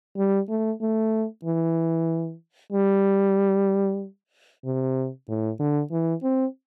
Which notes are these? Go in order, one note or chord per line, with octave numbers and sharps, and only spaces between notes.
G3
A3
A3
E3
G3
C3
A2
D3
E3
C4